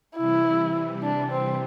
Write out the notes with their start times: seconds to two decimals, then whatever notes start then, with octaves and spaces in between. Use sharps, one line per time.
0.17 C3 E3 G3 E4
1.03 D4
1.32 C4